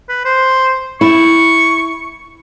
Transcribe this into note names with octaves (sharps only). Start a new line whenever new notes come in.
B4
C5
E4 C#6